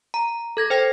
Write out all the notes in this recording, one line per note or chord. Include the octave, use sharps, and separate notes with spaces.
A#5
A4 G#6 A#6
C5 G5 A#6